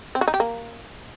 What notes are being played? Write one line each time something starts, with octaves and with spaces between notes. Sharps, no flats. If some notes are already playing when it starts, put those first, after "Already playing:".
C4
F#4
D#4
G4
A#3